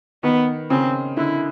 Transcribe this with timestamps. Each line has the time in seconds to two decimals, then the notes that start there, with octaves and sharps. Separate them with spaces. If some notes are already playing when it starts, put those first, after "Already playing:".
0.23 D#3 B3
0.70 C#3 C4
1.17 D3 E4